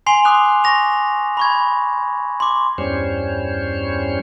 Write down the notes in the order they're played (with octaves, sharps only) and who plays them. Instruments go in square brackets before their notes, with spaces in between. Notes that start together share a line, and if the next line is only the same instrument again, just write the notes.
[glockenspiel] G#5 C6 C7 F7 G7
C6 D6 D#6 F#6 F7
C#6 A#6 F7
B5 C#6 G#6
C6 D6
[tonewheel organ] E2 G2 G3 C#4 C5 C#5